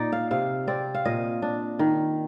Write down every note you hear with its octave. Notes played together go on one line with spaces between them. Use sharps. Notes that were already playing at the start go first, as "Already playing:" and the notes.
Already playing: A#2 D#4 D5
F5
C3 F5
C4 D5
F5
A#2 D#5
D4
D#3